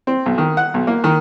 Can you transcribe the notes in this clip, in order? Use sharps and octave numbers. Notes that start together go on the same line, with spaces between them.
C4
B1
D#3
F#5
B1
A#3
D#3